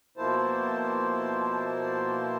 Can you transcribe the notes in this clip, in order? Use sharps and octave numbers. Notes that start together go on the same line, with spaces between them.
B2 F3 A#3 E4 C5 A5